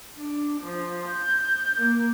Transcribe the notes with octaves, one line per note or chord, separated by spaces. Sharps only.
D4
F3
G6
A#3